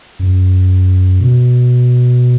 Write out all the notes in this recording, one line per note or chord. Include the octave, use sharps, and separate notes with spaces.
F#2
B2